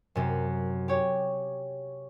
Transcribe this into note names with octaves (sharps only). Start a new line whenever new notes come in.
F#2 C3
G4 C#5